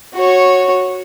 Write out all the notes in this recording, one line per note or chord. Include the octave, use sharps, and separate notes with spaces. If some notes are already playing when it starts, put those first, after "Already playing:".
F#4 C#5